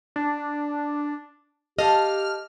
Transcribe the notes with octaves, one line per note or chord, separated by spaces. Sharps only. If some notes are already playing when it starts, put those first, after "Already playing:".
D4
G4 A4 D#5 F5 F6